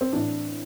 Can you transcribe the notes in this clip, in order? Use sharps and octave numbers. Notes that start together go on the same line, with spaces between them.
C4
A2 E3 D4